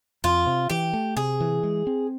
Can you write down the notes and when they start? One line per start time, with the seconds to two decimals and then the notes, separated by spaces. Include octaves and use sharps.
0.24 F2 F4
0.46 C3
0.70 E3 G4
0.93 A3
1.16 C3 G#4
1.40 E3
1.63 G#3
1.87 C4